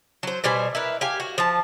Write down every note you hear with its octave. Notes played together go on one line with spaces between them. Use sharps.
F#3 C5
B2 G3 C5 G#5
E4 A#4 B4
G4 F5 G#5
F#4
F3 A5